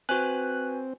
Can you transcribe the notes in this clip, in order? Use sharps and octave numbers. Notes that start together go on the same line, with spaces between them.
C4 F#4 B4 C5 G#5 F#6